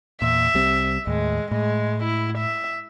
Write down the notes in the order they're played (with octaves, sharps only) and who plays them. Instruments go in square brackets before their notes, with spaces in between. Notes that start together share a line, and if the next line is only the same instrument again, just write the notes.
[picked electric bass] E2 A#2 [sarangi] E5
[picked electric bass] C2 G3 C4
[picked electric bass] D#2 A2 [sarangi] G#3
[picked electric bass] A2 [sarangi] G#3
[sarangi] E4
E5